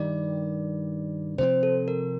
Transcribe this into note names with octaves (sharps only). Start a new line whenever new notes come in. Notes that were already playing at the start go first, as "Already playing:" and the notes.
Already playing: G2 D#3 G3 D5
C3 F3 C4 C5
A4
A#4